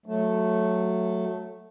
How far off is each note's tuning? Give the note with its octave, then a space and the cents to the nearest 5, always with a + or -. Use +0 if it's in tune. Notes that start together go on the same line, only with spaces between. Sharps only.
F#3 -10 A3 +0